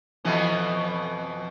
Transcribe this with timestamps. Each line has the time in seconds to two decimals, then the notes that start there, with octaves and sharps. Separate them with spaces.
0.25 F2 B2 E3